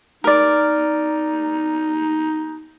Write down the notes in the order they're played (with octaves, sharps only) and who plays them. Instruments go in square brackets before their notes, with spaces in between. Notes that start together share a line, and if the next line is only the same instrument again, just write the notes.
[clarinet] D#4 [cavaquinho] A#4 D5